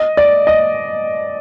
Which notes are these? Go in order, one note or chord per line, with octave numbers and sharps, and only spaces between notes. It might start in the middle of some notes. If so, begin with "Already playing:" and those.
Already playing: D#5
D5
D#5